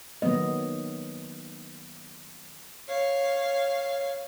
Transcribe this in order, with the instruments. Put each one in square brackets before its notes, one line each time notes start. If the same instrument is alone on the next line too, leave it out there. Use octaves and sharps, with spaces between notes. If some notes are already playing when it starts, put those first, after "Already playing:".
[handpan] D#3 F#3 A#3 B3 D#5
[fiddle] C#5 F5